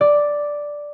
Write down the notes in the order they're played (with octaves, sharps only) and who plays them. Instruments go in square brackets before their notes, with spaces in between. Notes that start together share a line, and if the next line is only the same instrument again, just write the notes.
[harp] D5